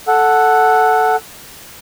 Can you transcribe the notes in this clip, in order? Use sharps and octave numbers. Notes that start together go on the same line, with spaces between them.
A4 F#5